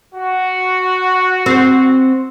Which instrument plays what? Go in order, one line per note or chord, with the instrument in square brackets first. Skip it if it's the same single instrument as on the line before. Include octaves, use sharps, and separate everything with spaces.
[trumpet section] F#4
[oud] C4 C5